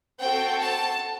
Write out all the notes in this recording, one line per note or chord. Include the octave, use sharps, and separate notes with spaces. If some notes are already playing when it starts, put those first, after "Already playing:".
C4 F#4 A4 G5
A5